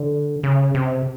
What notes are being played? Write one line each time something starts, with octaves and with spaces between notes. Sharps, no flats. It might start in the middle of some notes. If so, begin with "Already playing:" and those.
Already playing: D3
C#3
C3